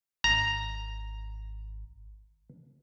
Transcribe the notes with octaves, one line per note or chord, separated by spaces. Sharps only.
G#1 A#5